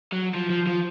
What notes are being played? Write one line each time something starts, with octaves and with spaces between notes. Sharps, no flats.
F#3
F3
F3
F3